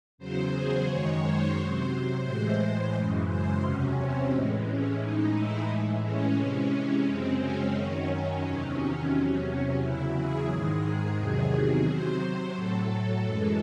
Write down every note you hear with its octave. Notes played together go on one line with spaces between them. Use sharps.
E2 C#3 F#3 C5
G#4
F#2 D#3 G#3 C#5
C5
C3 F#3
A2 E3 G#3 C5
F#2 C#3 E3 G#3
C5
E2 C3 F#3 C#4
C4
A2 E3 G#3
C#4
A2 E3 G#3 D#4
E4
A2 E3 G#3
C#4
C3 E3 G#3
F#2 C#3 G#3 C4
C#4
F#2 D#3 F#3
E2 C3 D#3 F#3
E2 C3 F#3 C#4
E2 C#3 F#3 E4
G#4
G#2 D#3 G#3
E2 C3 D#3 F#3
C3 F#3 C5
C5
A2 F#3 A4
F#2 E3 G#3